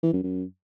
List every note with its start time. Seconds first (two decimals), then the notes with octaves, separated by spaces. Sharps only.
0.03 E3
0.13 F#2
0.23 F#2